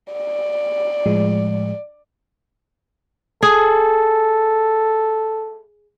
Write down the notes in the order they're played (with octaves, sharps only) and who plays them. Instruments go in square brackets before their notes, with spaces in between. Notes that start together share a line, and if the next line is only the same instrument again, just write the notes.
[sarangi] D5
[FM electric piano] A2 F3 G#3
[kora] G#4 [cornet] A4